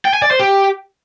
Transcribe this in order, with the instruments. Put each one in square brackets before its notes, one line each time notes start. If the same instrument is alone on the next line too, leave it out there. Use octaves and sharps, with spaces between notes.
[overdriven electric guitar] G5
G#5
D5
C5
G4